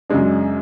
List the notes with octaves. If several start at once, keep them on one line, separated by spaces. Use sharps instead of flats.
F#2 C#3 G#3 D4